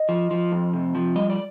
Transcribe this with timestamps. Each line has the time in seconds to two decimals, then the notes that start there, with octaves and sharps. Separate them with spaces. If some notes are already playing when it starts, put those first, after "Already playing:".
Already playing: D#5
0.09 F3
0.31 F3
0.52 F2
0.74 C3
0.95 F3
1.16 G3 D#5
1.30 D5